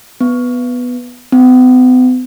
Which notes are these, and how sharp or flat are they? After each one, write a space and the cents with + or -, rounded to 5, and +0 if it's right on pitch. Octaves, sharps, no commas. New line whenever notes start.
B3 +0
B3 +45